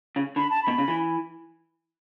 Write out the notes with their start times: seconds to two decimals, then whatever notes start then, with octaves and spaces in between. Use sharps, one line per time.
0.16 C#3
0.36 D3 B5
0.50 A5
0.63 B2 B5
0.78 C#3
0.88 E3